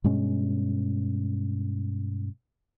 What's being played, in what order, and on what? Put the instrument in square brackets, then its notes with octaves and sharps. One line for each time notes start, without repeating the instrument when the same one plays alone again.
[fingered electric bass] G2 B2 G#3 C#4